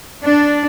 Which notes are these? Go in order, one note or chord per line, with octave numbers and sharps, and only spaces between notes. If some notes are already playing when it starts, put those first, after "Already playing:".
D4